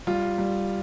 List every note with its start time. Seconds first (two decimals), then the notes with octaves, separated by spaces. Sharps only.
0.07 G3 F4
0.38 G3